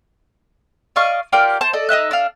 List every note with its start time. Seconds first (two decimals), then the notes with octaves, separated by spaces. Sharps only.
0.96 D5 D#5 F5 C#6
1.32 F4 G4 A#4 D5
1.61 C5 A5
1.73 A4 D5 D#5
1.89 D#4 D#5 E5 F#6
2.11 D4 F5